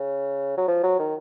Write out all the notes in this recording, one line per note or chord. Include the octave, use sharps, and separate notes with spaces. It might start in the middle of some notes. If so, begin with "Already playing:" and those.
Already playing: C#3
F#3
F3
F#3
D#3